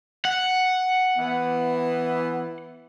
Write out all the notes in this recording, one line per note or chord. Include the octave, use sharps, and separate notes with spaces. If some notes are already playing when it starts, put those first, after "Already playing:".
F#5
E3 B3